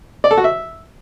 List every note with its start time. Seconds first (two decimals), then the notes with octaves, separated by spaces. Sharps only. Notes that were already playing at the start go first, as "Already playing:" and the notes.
0.24 D5
0.31 A4
0.37 F#4
0.44 E5